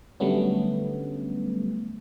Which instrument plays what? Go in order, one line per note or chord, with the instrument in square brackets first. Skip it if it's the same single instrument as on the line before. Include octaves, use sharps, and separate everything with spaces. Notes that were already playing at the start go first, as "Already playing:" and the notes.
[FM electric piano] D3 F#3 G3 A3 B3 C#4